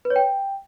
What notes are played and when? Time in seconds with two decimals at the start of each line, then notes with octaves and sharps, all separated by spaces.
0.05 B4
0.10 C#5
0.16 G5